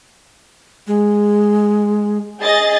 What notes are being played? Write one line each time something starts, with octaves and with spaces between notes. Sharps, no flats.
G#3
G#4 D#5 A6